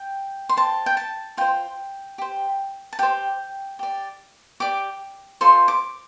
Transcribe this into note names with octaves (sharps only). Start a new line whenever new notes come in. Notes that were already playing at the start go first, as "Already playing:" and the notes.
Already playing: G5
C6
G4 C5 A5
G5
A5
F4 C5 G5
G4 C5
A5
G4 C5 G5
G4 D5
G4 D5 D6
F4 A4 C5 C6
D6